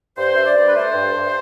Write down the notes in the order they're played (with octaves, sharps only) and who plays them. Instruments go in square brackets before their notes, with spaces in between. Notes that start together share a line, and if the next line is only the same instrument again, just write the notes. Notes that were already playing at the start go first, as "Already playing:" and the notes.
[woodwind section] G2 C5
G2 E5
D5
G2
B4
A3 C5
G2
G2